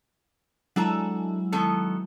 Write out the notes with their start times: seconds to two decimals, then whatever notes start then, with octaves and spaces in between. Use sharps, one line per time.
0.76 F#3 G#3 D4 E4 A4 A#5
1.52 D#3 B3 A4